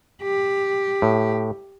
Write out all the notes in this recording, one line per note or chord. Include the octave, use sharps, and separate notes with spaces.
G4
A2